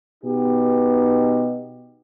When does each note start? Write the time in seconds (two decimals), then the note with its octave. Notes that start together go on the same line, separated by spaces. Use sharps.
0.24 B2 D#4 G4